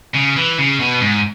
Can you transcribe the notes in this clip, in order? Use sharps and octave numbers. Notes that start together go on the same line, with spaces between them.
C#3
E3
C#3
B2
G#2